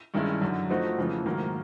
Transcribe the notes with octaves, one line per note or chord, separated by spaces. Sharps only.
G2 D#3 G#3 C#4 E4
F#2 D3 F#3
F3 A3 C4 D#4 F#4
F2 C#3 E3 A3
G#2 D#3 F#3 A#3